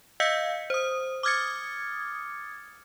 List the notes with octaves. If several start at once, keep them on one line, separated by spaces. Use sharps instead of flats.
D#5 F5 E6 G6 B6 C#7
C5 D#6
D6 D#6 F6 G#6 A6 C#7